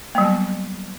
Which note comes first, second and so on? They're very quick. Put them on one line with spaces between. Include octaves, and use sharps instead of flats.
A#3 G3 F#3 B3